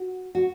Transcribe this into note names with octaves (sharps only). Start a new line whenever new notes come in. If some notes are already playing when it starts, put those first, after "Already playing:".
Already playing: F#4
F#4